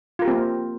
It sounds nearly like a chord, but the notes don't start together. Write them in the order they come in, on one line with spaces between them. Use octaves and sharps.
F4 A#4 G4 C4 A#3